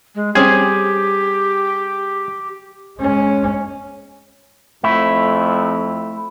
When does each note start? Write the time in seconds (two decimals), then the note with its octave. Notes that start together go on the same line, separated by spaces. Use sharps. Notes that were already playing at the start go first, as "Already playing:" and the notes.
0.15 G#3
0.35 G3 C4 C#4 G4 G#4
3.00 G#3 C#4
4.84 F2 A3 E4